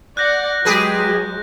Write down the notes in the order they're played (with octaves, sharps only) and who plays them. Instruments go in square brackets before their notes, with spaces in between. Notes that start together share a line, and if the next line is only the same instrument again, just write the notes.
[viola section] D5 F#5 [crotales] F#6 G6 A#6
[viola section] F#3 G#3 [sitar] G4 G#4 B4